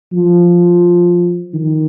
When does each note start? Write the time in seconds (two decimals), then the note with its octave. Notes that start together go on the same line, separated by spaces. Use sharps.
0.13 F3
1.54 D#3